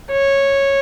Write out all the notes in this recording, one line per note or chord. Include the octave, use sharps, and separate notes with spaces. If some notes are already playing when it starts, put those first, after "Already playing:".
C#5